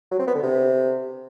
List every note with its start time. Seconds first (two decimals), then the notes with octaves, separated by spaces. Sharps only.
0.11 F#3
0.19 C4
0.27 B3
0.35 D3
0.43 C3